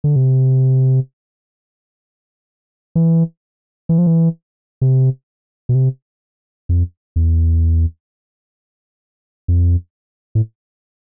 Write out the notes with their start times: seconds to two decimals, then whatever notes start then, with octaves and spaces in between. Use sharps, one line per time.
0.04 D3
0.16 C3
2.95 E3
3.89 E3
3.98 F3
4.06 E3
4.81 C3
5.69 B2
5.75 C3
6.69 F2
7.16 E2
9.48 F2
10.35 A2